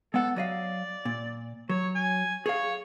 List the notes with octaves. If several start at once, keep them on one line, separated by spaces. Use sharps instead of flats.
G#3 B3 A4 F#5
F#3 D5 D#5 F5
A#2
F#3 C#5
G#5
G#4 C#5 F5